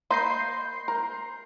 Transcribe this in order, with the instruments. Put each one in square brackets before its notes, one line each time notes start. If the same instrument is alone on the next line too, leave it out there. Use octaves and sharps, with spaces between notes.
[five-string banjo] A#3 D#5 B5 [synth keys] C6 G6 C7
[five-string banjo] A#4